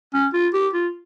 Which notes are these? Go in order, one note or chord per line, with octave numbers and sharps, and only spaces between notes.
C#4
F4
G4
F4